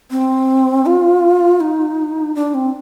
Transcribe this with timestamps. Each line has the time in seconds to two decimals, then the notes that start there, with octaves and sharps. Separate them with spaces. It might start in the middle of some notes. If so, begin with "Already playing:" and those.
0.11 C4
0.86 F4
1.61 D#4
2.35 D4
2.54 C4